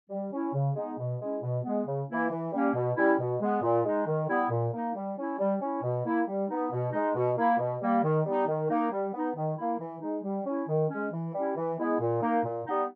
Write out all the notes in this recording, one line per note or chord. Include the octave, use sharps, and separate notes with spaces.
G3
C#4 E4
C#3
G#3 B3 D#4
B2
G#3 C#4 E4
B2
G#3 B3
C#3
E3 A#3 E4
E3
G3 A#3 C#4
B2
G3 C#4 E4
B2
G#3 B3
A#2
G#3 D#4
D#3
G3 B3 E4
A#2
A#3 D#4
G3
C#4 E4
G3
C#4 E4
B2
A#3 E4
G3
B3 D#4
B2
G#3 D#4
B2
A#3 E4
B2
G3 A#3
D#3
G3 B3 D#4
D#3
A#3 D#4
G3
B3 D#4
D#3
A#3 E4
E3
G#3 D#4
G3
C#4 E4
D#3
G#3 C#4
E3
G3 C#4 E4
E3
G#3 B3 E4
A#2
A#3 D#4
A#2
G3 B3 D#4